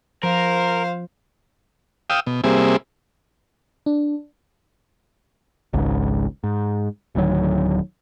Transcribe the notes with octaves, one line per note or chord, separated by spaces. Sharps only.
F3 A#4 C5 F5
F5 G5 D#6 E6
B2
C3 G3 A#3 C4 G#4 E5
D4
G#1 C#2 G#2
G#2
D1 D2 D#3 F#3